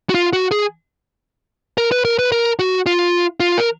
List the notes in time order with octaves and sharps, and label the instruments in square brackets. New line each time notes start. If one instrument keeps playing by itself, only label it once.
[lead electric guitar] F#4
F4
F#4
G#4
A#4
B4
A#4
B4
A#4
F#4
F4
F4
A#4